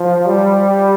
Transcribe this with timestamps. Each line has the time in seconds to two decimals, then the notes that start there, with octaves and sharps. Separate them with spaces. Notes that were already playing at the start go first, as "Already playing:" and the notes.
Already playing: F3
0.27 G3